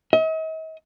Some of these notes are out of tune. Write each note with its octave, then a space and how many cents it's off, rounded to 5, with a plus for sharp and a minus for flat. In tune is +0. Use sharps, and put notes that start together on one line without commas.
D#5 +45